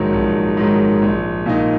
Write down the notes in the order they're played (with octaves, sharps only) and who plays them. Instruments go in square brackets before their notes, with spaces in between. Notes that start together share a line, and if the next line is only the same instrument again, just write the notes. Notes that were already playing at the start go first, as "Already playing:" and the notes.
Already playing: [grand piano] A#1 G#2 D#3 F#3
A#1
G#2 D#3 F#3
A#1
A#2 A#3 D#4